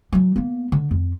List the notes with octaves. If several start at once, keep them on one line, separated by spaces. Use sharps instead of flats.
E3 F#3
A#3 B3
D3
F2